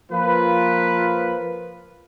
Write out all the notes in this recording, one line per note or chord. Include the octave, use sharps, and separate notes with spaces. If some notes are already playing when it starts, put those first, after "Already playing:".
F3 A#3 F4 B4